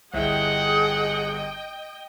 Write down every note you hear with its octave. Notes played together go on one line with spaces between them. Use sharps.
G1 E4 G#4 D#5 F#5 G5